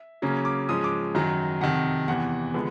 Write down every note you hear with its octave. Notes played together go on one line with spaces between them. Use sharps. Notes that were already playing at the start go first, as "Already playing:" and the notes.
Already playing: E5
C#3 F#3 A#3 C#4 A#5
D6
G#2 F3 G#3 C#4 D#6
D6
F#2 D#3 F#3 A#5
F2 C3 D#3 F#5
E2 C3 E3 F#5
D3 F3 G#3 B3